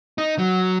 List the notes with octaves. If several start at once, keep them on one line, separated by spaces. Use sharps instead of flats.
D#4
F#3